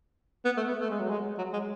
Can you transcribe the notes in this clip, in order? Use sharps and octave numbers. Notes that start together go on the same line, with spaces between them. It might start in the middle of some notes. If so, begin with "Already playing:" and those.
B3
A3
B3
A3
G#3
F#3
G#3
F#3
G#3